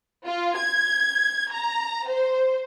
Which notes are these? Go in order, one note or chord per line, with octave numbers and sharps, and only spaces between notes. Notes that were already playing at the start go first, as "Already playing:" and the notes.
F4
G#6
A#5
C5